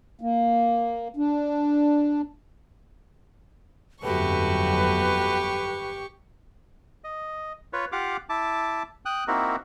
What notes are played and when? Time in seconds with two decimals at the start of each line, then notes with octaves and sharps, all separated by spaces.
0.21 A#3
1.17 D4
4.03 G1 F2 F#3 A3 F#4 G4 B4 C#6
7.04 D#5
7.73 F4 B4 C#5
7.92 F4 G4 F5 F#5 D6
8.29 E4 A5 D6
9.05 G5 D#6 F#6
9.28 A#3 C4 D#4 E4 F#4 A#4